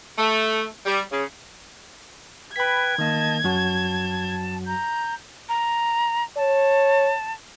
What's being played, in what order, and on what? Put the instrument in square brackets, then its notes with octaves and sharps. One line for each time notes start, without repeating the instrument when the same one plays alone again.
[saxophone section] A3
G3
C#3
[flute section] B4 G5 [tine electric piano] B5 B6 [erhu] G#6
[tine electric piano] D#3 A#3 [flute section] D#5 A5
[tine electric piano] F#2 F#3 F#4 [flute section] A5
[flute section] A#5 G6
[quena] A#5
[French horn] C#5 [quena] A5